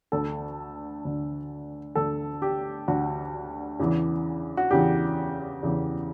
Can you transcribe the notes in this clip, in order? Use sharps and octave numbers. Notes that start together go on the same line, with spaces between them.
D2 D3 A4
D2 D3
D2 D3 A4
G4
D2 D3 F#4
E2 C#3 E3
F#4
E2 C#3 E3 G4
E2 C#3 E3